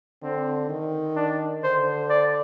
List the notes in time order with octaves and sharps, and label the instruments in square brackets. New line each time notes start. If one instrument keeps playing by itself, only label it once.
[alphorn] D3 [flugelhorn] C4
[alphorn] D#3
[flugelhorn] D4
[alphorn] D3 [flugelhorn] C5
[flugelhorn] D5